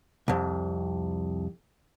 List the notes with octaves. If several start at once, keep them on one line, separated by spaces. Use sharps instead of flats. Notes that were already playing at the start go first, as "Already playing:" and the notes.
C2 F2